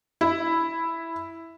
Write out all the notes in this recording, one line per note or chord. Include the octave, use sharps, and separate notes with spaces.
E4